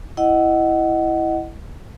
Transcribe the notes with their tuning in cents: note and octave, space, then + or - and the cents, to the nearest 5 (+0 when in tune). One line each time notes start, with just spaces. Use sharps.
E4 +0 D#5 +0 F#5 +15